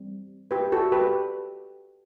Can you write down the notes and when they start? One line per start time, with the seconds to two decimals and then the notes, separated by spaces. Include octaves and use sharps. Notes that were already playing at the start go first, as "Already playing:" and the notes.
Already playing: E3 G3 C4
0.51 G4 B4
0.72 F#4 A4
0.92 G4 B4